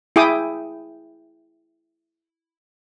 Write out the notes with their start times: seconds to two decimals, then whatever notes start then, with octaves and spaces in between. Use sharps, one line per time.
0.16 E4 G#4 G5 D6 D#6